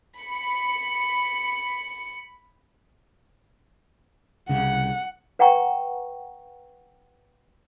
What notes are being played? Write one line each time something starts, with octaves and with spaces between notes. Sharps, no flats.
B5 C#7
C2 C#3 F#5
B4 F#5 G5 A#5 C#6